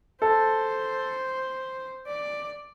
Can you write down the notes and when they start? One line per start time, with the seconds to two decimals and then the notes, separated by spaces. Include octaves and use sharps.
0.22 A4 C5
2.06 D5